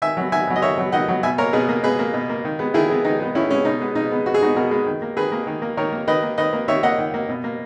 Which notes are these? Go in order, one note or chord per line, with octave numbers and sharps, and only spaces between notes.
D#3 E5 G#5
F#3 B3
D#3 E5 G#5
F#3 B3
D#5
D#3 C#5 E5
F#3 B3
D#3 D#5 F#5
F#3 B3
B2 E5 G#5
A#3 A#4 C#5
B2 G#4 B4
A#3
B2 G#4 B4
A#3
B2
A#3
D#3
G#3 B3
D#3 E4 G#4
G#3 B3
D#3 D#4
G#3 B3
D#3 C#4 E4
G#3 B3 C#4
B2 D#4
G#3 B3
B2 D#4
G#3 B3
B2 F#4
G#4
G#3 B3 D#4 F#4
B2 F#4 A#4
G#3 B3
D#3
A#3
D#3 G#4 B4
A#3
D#3
A#3
D#3 A#4 C#5
A#3
D#3 B4 D#5
A#3
D#3 B4 D#5
A#3
D#3 C#5 E5
A#3 D#5 F#5
D#3
A#3
B2
A#3